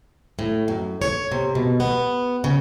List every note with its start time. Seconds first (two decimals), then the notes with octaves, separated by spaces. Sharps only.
0.39 A2
0.68 F#2
1.02 C#5
1.32 C3
1.55 B2
1.80 B3
2.44 C#3